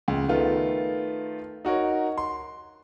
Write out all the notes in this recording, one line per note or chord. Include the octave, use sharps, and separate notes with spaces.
C#2
D#3 A3 B3 F4
D#4 F#4 A#4 C#5
C6